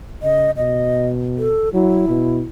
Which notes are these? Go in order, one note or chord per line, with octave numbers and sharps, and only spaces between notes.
C#3 D#5
B2 D#5
A4
F#3 E4
B2